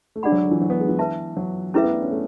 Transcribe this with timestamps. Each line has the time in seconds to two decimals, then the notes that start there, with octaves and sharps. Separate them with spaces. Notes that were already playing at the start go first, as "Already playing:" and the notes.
0.16 A3
0.23 G#3 D4 G#4 D5 F#5 B5
0.32 F#3
0.42 D3
0.51 E3
0.61 F#3
0.70 B3
0.80 G#3
0.89 E3
0.99 B4 E5 A5
1.37 F#3
1.74 A3 C#4 E4 G#4 B4 E5
1.84 B3
1.93 D4
2.02 C#4
2.11 A3